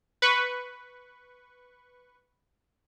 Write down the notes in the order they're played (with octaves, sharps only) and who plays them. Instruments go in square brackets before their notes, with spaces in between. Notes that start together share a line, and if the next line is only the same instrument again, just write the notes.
[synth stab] B4 C#6